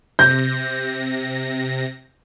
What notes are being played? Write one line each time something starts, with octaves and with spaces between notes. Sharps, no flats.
C3 G6 A#6